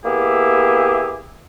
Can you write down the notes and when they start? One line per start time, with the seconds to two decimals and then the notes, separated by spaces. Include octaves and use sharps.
0.05 A#3 B3 E4 G4 G#4 E5